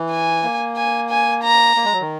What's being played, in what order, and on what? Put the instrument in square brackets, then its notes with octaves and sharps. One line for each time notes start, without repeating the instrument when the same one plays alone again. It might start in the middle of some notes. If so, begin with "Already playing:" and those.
Already playing: [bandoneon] E3
[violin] G#5
[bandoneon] A#3
[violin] G#5
G#5
A#5
[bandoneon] A#3
G#3
F#3
D#3